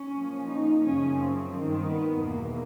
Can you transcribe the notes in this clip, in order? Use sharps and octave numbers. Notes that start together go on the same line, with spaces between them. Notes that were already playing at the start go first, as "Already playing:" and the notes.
Already playing: C#4
A#2 F3
D#4
F#2 C#3 F3 C#4
C4
G2 D#3
B3
E2 B2 A#3